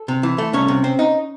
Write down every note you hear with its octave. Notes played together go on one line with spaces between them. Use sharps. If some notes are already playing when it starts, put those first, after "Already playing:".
Already playing: A4
C3
E3
A3
C2 C#4 C#5
C3
C4
D#4